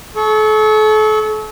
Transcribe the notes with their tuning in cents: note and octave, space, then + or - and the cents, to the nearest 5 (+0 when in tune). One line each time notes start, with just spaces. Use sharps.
A4 -35 C#6 +5